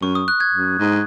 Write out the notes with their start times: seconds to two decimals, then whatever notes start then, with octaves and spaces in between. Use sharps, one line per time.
0.02 F#2 C#6
0.15 D#6
0.28 F#6
0.40 G#6
0.54 F#2
0.80 G#2